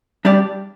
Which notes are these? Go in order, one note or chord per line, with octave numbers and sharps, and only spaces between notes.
G3 D4 G4 D5